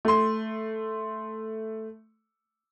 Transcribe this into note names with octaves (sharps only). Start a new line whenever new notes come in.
A3 C6